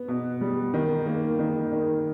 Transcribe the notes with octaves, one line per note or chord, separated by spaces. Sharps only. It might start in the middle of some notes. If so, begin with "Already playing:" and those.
Already playing: B3
B2
G3
D#3
A#3
D#3
D#3